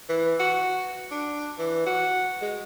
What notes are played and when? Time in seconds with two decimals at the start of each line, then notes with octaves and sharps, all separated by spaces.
0.09 E3
0.40 F#4
1.11 D4
1.58 E3
1.86 F#4
2.42 G#3